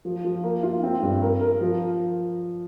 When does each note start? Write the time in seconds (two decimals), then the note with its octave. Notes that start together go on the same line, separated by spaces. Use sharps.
0.05 F3
0.24 F3
0.44 A#3
0.63 F4
0.83 C4
1.02 G2
1.22 A#4
1.41 A#4
1.61 F3